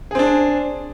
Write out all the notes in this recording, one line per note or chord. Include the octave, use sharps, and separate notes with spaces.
C4 D4 G#4